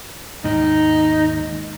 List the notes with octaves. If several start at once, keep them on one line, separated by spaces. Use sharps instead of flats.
D#2 G#2 D#3 D#4